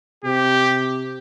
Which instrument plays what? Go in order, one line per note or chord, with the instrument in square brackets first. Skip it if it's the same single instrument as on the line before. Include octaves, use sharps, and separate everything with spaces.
[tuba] C3 [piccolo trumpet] G4